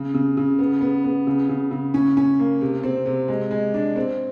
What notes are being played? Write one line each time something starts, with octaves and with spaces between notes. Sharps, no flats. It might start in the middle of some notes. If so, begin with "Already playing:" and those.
Already playing: C#3
C#3
C#3
B3
B3
B3
C#3
C#3
C#3
C#4
C#4
A#3
C3
C4
C3
G#3
G#3
D4
C4